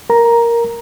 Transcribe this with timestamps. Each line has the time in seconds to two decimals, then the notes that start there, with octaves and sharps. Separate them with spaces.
0.10 A#4 A#5